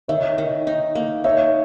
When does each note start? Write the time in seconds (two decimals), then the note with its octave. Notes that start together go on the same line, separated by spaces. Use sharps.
0.08 D#3 C#5 E5
0.38 D#3
0.67 D#4
0.95 A#3
1.24 D#4 C#5 E5